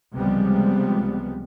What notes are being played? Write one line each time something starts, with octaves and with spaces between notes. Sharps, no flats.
C#2 C3 F3 G3 G#3 B3